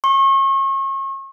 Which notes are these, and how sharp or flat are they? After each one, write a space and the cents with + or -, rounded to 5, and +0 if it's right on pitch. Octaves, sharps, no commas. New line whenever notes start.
C#6 -35